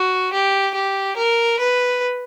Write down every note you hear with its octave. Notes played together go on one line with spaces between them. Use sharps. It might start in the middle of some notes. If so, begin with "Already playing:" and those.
Already playing: F#4
G4
G4
A#4
B4